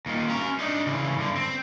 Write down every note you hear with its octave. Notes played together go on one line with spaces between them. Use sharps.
D#2 A#2
C#4 A#5
D4 D#4
C#3 E3
G2 D3
C4